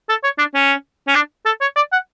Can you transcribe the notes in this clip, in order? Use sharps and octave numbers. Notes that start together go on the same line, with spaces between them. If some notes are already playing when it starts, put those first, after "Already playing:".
A4
C#5
D4
C#4
C#4
D4
A4
C#5
D5
F#5